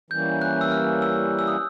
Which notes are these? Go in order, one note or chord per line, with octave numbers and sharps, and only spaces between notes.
E3 G3 A#3 C#4 G6
F#6
E6
F6
E6
E6
D#6